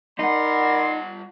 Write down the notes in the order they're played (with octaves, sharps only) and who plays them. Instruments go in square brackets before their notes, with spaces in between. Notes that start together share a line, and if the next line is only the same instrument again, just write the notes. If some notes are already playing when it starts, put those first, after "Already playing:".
[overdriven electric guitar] G3 F#5 [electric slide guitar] D#4 [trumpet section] A#4 D5 B5 [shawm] C6